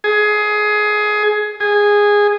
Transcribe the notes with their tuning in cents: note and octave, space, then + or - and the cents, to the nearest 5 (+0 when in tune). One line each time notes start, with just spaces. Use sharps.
G#4 +20
G#4 -10